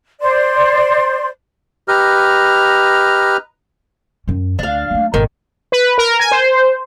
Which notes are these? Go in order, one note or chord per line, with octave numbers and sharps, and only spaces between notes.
C5 D5 C6
G4 B4 D#5 A#5 F6
F#2 C#4
D2 D4 F5
F#3 A3
G#1 B2 D#3
B4
A#4
G#5
C5